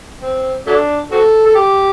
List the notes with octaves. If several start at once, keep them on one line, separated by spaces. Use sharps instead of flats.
C4
F#3 A3 D4
C4 F#4 A4
A4
G4